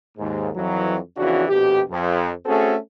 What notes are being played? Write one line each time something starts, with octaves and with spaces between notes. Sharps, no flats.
D#2 G#2
F2 E3 F#3
F2 C#3 E3 D4 F#4
A#1 F2 B2 G4
F2
A3 C4 C#4 F#4 G#4 A4